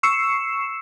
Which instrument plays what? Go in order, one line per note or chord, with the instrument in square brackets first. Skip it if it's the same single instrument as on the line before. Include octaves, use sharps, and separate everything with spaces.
[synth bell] C#6 E6 C7 C#7 E7